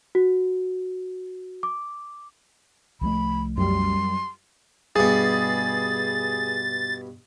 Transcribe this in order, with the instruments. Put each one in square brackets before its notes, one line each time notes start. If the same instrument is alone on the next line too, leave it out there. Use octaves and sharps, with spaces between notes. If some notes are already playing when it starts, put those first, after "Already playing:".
[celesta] F#4
D6
[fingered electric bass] C2 F3 A3 [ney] B5
[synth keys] F#2 G3 [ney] C6
[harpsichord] G2 B2 [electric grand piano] G#4 [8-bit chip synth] A6